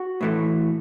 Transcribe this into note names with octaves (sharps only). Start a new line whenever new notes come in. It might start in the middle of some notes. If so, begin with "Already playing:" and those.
Already playing: F#4
A2 E3 A3